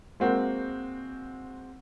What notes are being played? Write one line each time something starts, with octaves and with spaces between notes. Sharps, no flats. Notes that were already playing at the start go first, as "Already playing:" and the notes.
G#3 A#3 C4 F#4